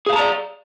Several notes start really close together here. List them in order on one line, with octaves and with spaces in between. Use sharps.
G#4 F5 A5 A#5 D5